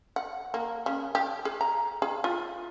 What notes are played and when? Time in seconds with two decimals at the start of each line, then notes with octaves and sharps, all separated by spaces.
0.16 F#5
0.54 A#3
0.86 C#3
1.15 G4
1.45 G#4
1.61 A#5
2.02 G#4
2.24 F4